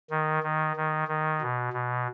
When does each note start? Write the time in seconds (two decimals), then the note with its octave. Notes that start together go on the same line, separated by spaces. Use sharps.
0.10 D#3
0.43 D#3
0.76 D#3
1.08 D#3
1.42 B2
1.73 B2